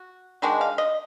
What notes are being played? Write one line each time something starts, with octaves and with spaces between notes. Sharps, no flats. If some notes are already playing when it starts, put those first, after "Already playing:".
Already playing: F#4
D#3 G#3 D4 F#4
F5
D#5